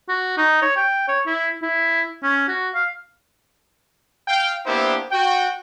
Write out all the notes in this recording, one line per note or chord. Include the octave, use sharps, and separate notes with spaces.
F#4
D#4
C#5
G5
C#5
E4
E4
C#4
F#4
F5
F5 G5
A#3 B3 D4 E4 G4 C5
F#4 G5